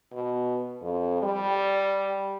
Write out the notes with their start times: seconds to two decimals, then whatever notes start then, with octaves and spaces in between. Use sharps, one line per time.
0.13 B2
0.81 F2
1.22 G3